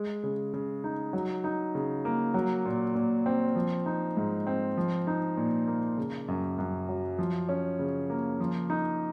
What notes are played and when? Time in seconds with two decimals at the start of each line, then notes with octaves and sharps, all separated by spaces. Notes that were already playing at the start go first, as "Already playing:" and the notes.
Already playing: G#3
0.23 C#3
0.53 C#3
0.84 D#4
1.13 F#3
1.44 D#4
1.75 C#3
2.05 A#3
2.34 F#3
2.66 A#2
2.95 A#2
3.26 C4
3.56 F3
3.86 D#4
4.17 G#2
4.47 C4
4.77 F3
5.07 D#4
5.37 A#2
5.67 A#3
5.97 C#3
6.28 F#2
6.58 F#2
6.89 F#3
7.18 F3
7.49 C#4
7.79 C#3
8.10 A#3
8.40 F3
8.70 D#4